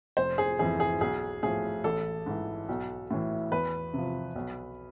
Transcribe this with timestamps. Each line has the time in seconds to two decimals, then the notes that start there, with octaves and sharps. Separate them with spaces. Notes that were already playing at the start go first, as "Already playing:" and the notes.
0.17 F1 C5
0.38 G#4
0.59 F2 E3 G#4
0.80 G#4
1.01 B1 G#4
1.43 A2 F3 G#4
1.84 A1 A4
2.26 G#2 E3
2.69 B1
3.11 A2 E3
3.52 E2 B4
3.93 C3 F3
4.35 B1